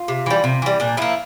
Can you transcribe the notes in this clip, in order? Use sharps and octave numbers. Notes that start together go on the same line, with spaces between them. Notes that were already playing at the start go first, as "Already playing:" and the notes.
Already playing: F4
C3
E3 G3
C3
E3 G3
A#2 D4
F3 A#3 E4